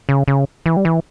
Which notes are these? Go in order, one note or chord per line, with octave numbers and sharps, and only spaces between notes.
C#3
C#3
E3
G3
E3